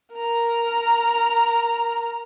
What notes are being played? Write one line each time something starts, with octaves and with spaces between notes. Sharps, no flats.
A#4 A#5